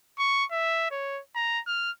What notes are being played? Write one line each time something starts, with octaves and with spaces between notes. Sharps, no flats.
C#6
E5
C#5
A#5
F6